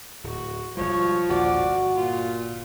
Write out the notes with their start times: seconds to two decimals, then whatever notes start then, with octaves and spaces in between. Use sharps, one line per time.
0.24 D1 F#4
0.77 E1 A#1 F3 G3 C#5
1.30 A#1 D#2 D3 F#4 D5
1.61 G1
1.95 A#2 F4